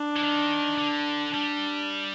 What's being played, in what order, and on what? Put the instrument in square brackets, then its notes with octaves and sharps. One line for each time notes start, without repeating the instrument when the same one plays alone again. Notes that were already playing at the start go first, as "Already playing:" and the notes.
Already playing: [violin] D4
[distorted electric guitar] E3
D#3
D3
[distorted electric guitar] G3 [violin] D4